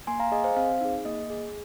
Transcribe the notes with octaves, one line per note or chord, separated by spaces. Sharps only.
A#3 G#5 C6
F5 A#5
G#4 D#5 G#5
C5 F5
C4 C5 F5
D#4 G#4
A#3 D#5
G#4